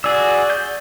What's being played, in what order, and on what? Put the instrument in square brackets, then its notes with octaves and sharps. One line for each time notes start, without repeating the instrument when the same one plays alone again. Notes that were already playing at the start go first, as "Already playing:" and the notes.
[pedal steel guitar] F#4 G#4 E6 [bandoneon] D5
[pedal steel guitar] G6